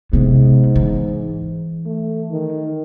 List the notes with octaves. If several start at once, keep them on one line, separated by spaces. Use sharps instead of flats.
G#2 C3 B3
E3
A3
D#3